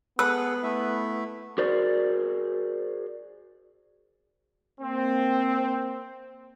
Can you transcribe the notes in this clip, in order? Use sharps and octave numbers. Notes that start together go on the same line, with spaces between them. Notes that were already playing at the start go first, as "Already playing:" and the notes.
B3 G#4 A4 B4 F#5 E6
A3 E4 E5
F#4 G#4 A#4 C5 D5
A#3 C4